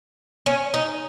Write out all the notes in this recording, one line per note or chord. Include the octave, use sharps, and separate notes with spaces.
C#4
D#4